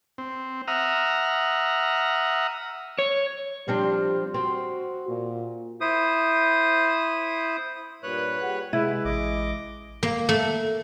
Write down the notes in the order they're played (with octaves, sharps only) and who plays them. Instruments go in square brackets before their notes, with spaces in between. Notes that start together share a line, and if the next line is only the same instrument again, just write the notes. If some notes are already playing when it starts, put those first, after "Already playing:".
[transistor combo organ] C4
E5 F#5 A#5 D#6 F6
[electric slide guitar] C#5
[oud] F3 C4 D4 [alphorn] G3
[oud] C4 [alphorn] F#4
[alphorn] A#2
[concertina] E4 C5 D#6
[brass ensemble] G2 A#2 [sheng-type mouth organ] B4 C#5 F#6
[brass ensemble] G3 G#4 F#5
[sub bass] C3 [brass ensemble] G#3 [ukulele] E4 [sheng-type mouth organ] B4
[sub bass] A1 [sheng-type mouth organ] D#5 D6
[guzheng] A#3
A3